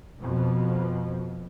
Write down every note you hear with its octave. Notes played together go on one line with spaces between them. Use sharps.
F2 B2